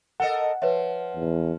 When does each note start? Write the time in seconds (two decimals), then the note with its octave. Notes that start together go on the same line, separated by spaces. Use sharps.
0.20 A4 A#4 D#5 F#5
0.62 F3 B4 C#5 E5
1.16 E2